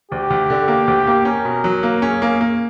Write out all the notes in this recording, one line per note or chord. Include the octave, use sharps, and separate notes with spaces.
D2 G4
D2
D3
A#3
D2
A#3
C#4 A#4
B2
F#3
A#3
C#4 G#4
A#3
A#3